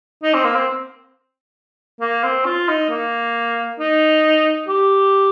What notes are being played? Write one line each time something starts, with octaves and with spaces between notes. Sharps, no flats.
D#4
C4
A#3
C4
A#3
C4
F4
D#4
A#3
D#4
G4